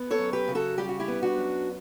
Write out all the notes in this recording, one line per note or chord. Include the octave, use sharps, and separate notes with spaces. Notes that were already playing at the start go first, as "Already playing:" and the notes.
Already playing: B3
A4 C#5
F#2
G4 B4
C#3
F#4 A4
G3 G4
F#4
E4 G4
B3
D4 F#4
F#2